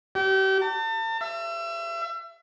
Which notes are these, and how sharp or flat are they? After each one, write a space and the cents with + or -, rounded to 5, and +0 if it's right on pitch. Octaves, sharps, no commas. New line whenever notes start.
G4 -35
A5 +40
E5 +35